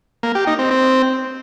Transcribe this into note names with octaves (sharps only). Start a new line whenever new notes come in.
A#3
G4
D#4
C4
C4